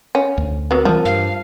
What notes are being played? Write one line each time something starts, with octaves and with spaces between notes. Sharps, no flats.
C#4
D2
F#3 B3 C4 A#4
E3 F3 G3 A5
G2 F5